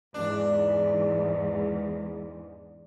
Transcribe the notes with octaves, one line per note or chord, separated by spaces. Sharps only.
E2 G#2 D4